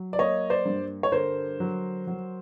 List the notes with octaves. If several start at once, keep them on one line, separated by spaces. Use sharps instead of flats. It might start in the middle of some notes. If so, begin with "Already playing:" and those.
Already playing: F#3
D5
A#3 C#5 D#5
C5 D5
G2
C#5
D3 A#4 C5
F#3
F#3